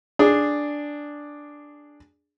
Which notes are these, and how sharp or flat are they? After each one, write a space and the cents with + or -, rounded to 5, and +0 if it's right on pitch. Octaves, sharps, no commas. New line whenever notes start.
D4 +0 G#4 -5